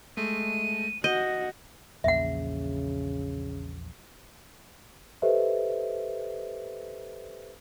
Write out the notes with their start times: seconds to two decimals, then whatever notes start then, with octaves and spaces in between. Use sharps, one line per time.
0.17 G#3 A3 D#7
1.04 F#4 D#5 G6
2.04 A#1 E2 C#3 A#3 E5 F#5
5.22 G4 A4 B4 C5 D#5 E5